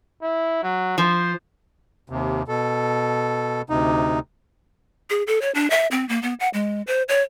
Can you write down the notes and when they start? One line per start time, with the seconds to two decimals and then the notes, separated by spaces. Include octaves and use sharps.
0.22 E4
0.63 F#3
0.98 F3 C5
2.10 D#2 C3
2.48 B2 A4
3.70 D2 C3 D#4
5.10 G#4
5.27 A4
5.42 C#5
5.55 D4
5.70 E5
5.91 C4
6.09 A#3
6.23 B3
6.40 F#5
6.54 G#3
6.87 C5
7.09 C#5